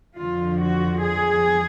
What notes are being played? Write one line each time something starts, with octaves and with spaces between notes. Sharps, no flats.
F2 D3 F3 F4
F#4
G#4